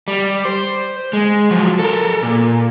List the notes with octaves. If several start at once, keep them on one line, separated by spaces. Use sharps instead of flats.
G3
C5
G#3
F3 F#3
A4 A#4
A#2